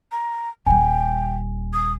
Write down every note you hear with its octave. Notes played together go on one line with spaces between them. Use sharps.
A#5
D#1 G3 G5 G#5
D#6